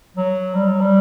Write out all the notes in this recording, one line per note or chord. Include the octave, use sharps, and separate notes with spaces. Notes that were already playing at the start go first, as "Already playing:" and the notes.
F#3
G3
F#3
G3